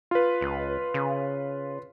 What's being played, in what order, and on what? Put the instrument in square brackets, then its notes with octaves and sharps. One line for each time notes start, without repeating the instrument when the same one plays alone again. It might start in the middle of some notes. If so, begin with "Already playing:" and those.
[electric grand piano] F4 B4
[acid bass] C#2
C#3